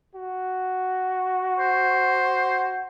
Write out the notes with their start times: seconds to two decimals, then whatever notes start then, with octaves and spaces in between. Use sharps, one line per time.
0.15 F#4
1.59 C5